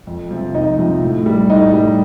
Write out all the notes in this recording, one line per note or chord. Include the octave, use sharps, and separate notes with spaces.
F2
C3 F3
F2 D#4 D#5
C3 F3
A2
G3
A2 D#4 D#5
G3